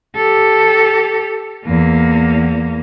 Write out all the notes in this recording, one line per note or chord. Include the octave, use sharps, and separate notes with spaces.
G4 A4
E2 A#3